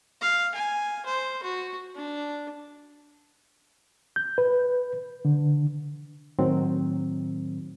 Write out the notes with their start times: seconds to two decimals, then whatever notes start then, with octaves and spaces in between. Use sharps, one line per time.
0.22 F5
0.54 G#5
1.06 C5
1.43 F#4
1.95 D4
4.16 G6
4.38 B4
5.25 D3
6.39 A2 D#3 F#3 C4